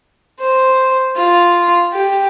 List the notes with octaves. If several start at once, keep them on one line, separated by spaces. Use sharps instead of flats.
C5
F4
G4